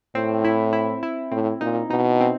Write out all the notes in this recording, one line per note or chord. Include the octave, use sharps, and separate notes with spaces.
A2 C4
E4
E4
E4
A2 C4
A#2 D#4
B2 D#4
C4